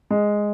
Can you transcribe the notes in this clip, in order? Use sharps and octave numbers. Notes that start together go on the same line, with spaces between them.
G#3